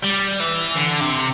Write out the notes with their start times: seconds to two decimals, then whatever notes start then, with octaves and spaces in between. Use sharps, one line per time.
0.03 G3
0.40 E3
0.76 D3
1.01 C3